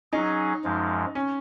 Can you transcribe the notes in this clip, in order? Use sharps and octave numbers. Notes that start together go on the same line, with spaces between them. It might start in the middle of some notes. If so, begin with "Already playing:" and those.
F#3 C#4 D#4 G#4
F#2 F3 G#3
C#4